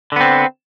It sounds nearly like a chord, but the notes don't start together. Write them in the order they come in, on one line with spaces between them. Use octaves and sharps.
D3 B3 C4